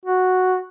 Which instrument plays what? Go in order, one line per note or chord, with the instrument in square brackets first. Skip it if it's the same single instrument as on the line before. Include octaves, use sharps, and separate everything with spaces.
[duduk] F#4